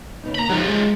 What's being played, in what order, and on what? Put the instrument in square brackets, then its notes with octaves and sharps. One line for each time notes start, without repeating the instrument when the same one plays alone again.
[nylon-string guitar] C#3 B3 D#4
[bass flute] A#3 [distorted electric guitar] A#5 B5
[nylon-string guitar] F2 D#4 G4 [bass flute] F3 [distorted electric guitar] F#3 F4
[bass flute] G#3 [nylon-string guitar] C#4 G#4